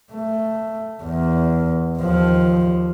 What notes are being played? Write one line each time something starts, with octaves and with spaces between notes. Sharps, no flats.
A3
E2
D#2 F3